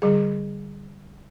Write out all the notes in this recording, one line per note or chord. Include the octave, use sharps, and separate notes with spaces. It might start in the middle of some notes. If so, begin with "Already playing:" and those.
D3 G3 G#4